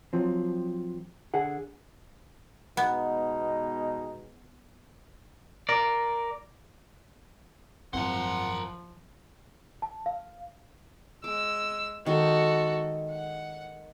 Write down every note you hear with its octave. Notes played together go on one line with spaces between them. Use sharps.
F3 F#3 C4
D3 G#4 F#5
B2 G#3 B3 D#4
A#4 D5
G#1 F#2 F3 C4 A#4 C5 F#5
A5
F5
G#3 D6 E6
D#3 G#3 F#4 A4
F#5